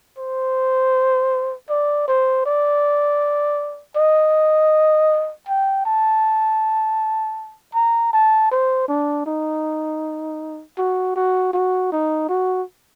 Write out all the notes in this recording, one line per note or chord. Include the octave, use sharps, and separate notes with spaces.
C5
D5
C5
D5
D#5
G5
A5
A#5
A5
C5
D4
D#4
F#4
F#4
F#4
D#4
F#4